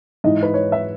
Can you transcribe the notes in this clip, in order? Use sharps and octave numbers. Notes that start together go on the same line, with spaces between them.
G#2 E3 D#5
B4
C#5
E5